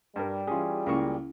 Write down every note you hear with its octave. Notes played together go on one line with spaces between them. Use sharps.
G2 G3 A#4
E3 C#4 F4 G#4
C#2 A#3 C#4 E4 C#6